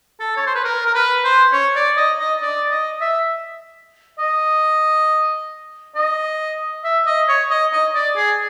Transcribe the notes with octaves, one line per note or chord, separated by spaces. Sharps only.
A4
C#5
C5
B4
A#4
A#4
B4
C5
C#5
D5
D#5
D#5
D5
D#5
E5
D#5
D#5
E5
D#5
C#5
D#5
D#5
D5
G#4